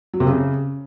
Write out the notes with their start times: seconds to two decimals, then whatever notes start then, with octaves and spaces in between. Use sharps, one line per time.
0.13 F#3
0.20 C3
0.27 C#3